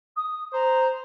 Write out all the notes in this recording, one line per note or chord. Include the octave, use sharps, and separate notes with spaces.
D#6
C5 A#5